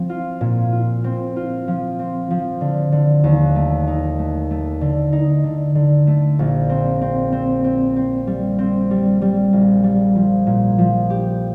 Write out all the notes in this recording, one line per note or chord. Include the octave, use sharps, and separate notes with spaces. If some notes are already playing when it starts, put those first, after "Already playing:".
Already playing: F3 C4
F4
A#2
F4
C4
F4
F3
C4
F3
D3
D3
D#2
A3
D#4
A3
A3
D3
D#4
D3
D3
A3
A#1
C4
C4
C4
C4
C4
G3
C4
G3
G3
A#1
G3
F3
A#2
F3
G4